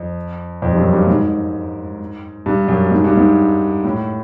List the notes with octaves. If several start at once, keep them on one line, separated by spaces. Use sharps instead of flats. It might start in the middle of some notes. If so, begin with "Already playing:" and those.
Already playing: F2
F2
G2
F#2
G2
G#2
G2
F#2
G#2
G2
G#2
A2